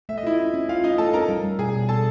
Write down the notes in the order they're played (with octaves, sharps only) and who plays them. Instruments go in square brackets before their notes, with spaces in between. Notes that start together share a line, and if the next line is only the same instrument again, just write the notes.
[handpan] A3 [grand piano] E5
[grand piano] D#5
[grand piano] E4 E5 [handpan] F4
[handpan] C#4
C#4
[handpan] C#4 [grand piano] F4 F5
[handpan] A3 [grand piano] D#4 D#5
[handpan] A3 [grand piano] A4 A5
[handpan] C#4 [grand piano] A#4 A#5
[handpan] G3
G3
[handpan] B2 [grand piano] G#4 G#5
[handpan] B2
[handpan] B2 [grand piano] A4 A5